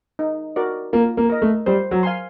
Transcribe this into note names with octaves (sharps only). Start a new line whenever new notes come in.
D#4
F#4 A#4 D5
A#3 F4
A#3
A#4 D#5
A3
G3 C5
F#3
F5 G#5 C6